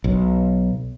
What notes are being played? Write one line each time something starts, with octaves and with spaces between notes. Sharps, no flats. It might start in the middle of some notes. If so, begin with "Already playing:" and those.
B1